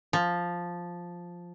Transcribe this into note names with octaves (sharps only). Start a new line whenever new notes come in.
F3